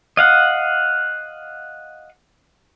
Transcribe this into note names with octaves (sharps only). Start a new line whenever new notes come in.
D#5 F5 F#5